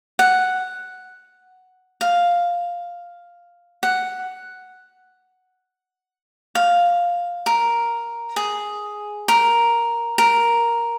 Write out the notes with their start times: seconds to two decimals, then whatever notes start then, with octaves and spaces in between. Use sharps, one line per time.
0.19 F#5
2.01 F5
3.83 F#5
6.55 F5
7.46 A#4
8.36 G#4
9.28 A#4
10.18 A#4